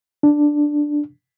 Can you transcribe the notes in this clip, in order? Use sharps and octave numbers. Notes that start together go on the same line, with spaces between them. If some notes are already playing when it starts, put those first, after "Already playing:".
D4